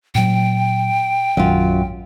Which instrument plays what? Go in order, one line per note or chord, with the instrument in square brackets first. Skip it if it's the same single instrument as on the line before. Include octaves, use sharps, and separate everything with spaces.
[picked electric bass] A#2 F#3 [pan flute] G5
[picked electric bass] A#1 D#3 [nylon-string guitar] F#2 F4